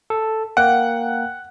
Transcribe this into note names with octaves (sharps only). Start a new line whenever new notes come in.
A4
A#3 F#5 G5